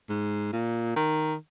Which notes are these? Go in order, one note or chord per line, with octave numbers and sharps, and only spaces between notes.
G#2
A#2
D#3